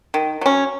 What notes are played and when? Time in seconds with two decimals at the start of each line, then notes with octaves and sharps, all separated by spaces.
0.14 D#3
0.41 F#3 C#4